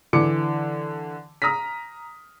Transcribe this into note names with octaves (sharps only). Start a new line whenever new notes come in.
D3 E3 D6 C#7
A#5 D#6 F6 A#6 B6